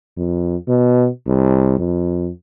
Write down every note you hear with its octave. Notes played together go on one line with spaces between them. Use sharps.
F2
B2
C2
F2